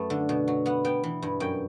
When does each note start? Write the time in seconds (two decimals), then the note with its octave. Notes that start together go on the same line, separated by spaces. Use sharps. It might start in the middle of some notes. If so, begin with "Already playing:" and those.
Already playing: F#2 A3 B3
0.10 D3
0.29 B2
0.48 F#3
0.66 B3 F#5
0.85 B3 G5
1.03 E3
1.22 G2
1.40 F#2 G5